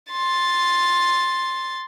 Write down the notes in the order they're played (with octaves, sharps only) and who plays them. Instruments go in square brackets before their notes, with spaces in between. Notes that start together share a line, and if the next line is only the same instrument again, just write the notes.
[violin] C6 A6